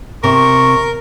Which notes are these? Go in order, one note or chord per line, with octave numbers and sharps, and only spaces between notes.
C3 A#4 C#6